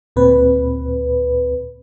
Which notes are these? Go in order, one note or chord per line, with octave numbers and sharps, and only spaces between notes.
D2 A#2 C4 B4